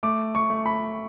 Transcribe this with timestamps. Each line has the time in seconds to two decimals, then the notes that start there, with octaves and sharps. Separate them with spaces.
0.03 A3 D6
0.35 C#6
0.50 A3
0.66 B5